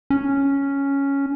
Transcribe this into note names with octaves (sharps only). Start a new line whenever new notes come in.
C#4